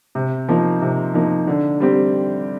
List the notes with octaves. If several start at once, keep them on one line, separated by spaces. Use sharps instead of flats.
C3
F3 A#3 D#4
C3
F3 A#3 D#4
D3
G3 C4 G4